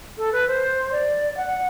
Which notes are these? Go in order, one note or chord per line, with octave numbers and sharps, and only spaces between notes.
A4
B4
C5
D5
F#5